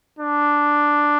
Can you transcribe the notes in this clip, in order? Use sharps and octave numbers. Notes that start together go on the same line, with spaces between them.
D4